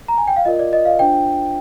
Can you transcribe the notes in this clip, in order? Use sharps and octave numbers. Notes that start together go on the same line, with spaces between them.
A#5
G#5
G5
F5
F4 A#4 D5 D#5
D5
D#5
F5
D4 F4 C5 G5